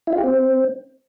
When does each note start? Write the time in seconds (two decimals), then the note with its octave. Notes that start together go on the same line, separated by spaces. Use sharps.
0.07 E4
0.13 F4
0.18 G4
0.24 C4